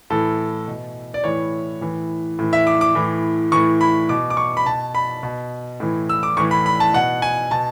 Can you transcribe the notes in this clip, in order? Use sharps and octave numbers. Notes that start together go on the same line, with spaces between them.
A2 E3 A4
B2
D5
A2 E3 C#5
A2 E3
A2 E3
E5
D6
D6
A2 E3
A2 E3 C#6
B5
B2 D6
D6
C#6
B5
B2 A5
B5
B2
A2 E3
E6
D6
A2 E3 C#6
B5
B5
A5
B2 F#5
G#5
B2 A5